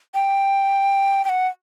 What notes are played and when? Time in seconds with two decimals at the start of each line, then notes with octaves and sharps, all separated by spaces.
0.14 G5
1.25 G5
1.29 F#5